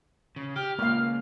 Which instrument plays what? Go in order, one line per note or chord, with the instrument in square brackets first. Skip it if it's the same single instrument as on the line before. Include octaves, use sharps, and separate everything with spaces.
[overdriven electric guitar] C#3
[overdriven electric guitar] G4 [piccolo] F6
[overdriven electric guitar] C#2 [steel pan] A#3 F5